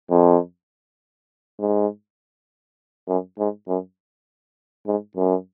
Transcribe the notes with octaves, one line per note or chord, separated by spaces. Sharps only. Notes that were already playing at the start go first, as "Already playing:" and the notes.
F2
G#2
F#2
G#2
F#2
G#2
F#2